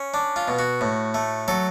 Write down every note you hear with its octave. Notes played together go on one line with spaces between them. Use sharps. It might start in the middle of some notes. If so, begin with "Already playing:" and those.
Already playing: C#4
D4
F4
B2
F#4
A2
A3
F#3 A4